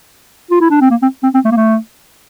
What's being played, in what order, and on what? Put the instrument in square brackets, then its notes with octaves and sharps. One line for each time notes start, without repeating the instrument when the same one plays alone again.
[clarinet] F4
E4
D4
C4
A#3
C4
C4
C4
A3
A#3
A3